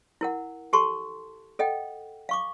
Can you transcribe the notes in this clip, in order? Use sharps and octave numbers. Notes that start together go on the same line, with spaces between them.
E4 A#4 F#5
G4 A4 A5 C6 C#6
A4 D#5 F#5 G5
F5 C#6 D6